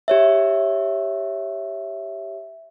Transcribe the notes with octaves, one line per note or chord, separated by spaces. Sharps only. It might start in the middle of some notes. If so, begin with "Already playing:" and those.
G4 C#5 E5